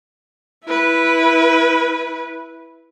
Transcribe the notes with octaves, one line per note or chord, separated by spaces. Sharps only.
E4 B4